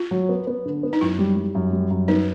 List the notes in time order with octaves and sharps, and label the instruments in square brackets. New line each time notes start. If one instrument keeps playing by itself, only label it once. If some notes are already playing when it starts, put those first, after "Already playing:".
Already playing: [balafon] F4
[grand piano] F#3
B3
B3
D3
B3
[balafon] D#4
[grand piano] F#2 [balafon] E4
[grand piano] G3
G3
F#2
G3
F#2
[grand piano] B3 [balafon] D#4